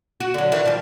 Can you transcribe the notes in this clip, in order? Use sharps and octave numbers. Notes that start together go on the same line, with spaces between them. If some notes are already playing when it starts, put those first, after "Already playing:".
F#4
D3 F#3
D#3 E3 E4
F3 G3